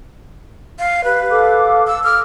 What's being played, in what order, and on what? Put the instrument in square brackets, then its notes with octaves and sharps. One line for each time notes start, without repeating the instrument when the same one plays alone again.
[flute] F5
[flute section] G4 [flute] B4
[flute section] A4 F5 D6
[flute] E6
[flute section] D6 [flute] F6